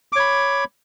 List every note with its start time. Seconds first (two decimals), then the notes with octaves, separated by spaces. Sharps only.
0.13 D6
0.16 C#5
0.20 B5